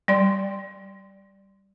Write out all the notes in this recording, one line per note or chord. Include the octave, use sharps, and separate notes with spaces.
G3 D5 C6